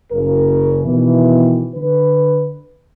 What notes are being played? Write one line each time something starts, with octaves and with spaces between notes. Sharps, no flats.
F#1 C#3 A#4
B2 D#3 E3
D3 B4